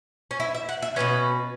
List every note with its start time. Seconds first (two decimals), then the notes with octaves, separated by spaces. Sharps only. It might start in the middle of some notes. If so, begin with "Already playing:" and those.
0.31 C#4
0.40 E4
0.54 E5
0.69 F#5
0.82 E5
0.96 B2 F#3 C#4 B4